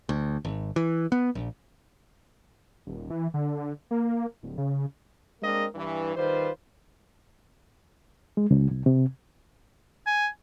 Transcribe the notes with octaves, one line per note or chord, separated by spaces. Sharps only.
D2
G#1
E3
B3
A#1
D#1
E3
D3
A#3
D1
C#3
G#3 A#3 C4 D4 A#4 D#5
G2 E3
D#3 G3 F4 B4 C5
G#3
C#2
C2
C3
G#5